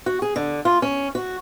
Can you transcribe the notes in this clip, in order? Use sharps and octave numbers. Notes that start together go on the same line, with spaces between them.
F#4
G#4
D3
F4
C#4
F#4